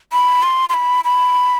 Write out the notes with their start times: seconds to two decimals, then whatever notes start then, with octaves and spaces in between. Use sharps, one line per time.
0.12 B5
0.43 C6
0.69 C6
0.74 B5
1.05 B5